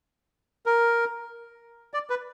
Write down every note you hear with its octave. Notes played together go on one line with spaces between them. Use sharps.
A#4
D5
B4